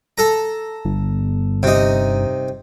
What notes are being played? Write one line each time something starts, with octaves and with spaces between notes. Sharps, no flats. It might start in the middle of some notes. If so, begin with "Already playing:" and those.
A4 A#5
G1
C3 D#4